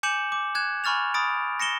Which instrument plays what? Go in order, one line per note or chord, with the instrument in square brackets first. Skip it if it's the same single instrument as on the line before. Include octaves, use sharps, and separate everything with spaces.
[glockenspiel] G#5 D6 G6 C#7 E7 F#7
D6
F#6 G#6 E7
G#5 B5 C#6 F6 A6 F7
B5 D#6 A6 D7
A#6 C#7 E7 G7